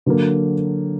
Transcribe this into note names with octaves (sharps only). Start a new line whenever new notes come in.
D3 F#3 A#3